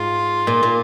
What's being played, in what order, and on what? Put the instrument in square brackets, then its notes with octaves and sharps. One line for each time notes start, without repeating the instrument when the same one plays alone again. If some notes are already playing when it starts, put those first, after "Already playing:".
Already playing: [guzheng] G#2 [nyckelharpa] F4
[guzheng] A#2
A#2